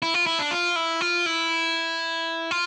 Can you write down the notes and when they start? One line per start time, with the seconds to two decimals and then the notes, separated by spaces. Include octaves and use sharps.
0.02 E4
0.14 F4
0.26 E4
0.39 D4
0.51 F4
0.76 E4
1.01 F4
1.26 E4
2.51 F4